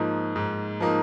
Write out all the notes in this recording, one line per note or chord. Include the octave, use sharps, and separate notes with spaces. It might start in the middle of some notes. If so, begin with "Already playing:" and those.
Already playing: G#2 F3 A#3 D#4
G#2
F3 A#3 D#4